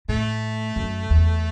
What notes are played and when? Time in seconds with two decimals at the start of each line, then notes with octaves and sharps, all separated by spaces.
0.08 A2 A3
0.76 F#2
1.10 E2